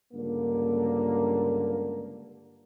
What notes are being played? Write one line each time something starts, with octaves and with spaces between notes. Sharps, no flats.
C#2 G2 D3 A#3